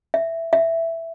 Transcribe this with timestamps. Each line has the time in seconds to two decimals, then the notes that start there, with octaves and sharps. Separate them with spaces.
0.14 E5
0.53 E5